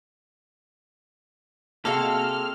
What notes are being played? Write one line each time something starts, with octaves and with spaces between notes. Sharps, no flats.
C3 G#3 A#3 C4 F#4 A4 F5 F6